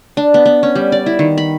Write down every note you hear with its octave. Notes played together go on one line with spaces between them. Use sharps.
D4
B3
B3
C#4
G3
D5
E4
D#3
B5